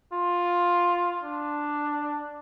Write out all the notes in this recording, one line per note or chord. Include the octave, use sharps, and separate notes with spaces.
F4
D4